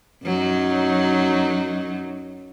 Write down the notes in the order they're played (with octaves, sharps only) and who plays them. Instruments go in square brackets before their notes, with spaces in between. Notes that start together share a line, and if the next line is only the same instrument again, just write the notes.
[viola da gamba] F#2 F#3 D#4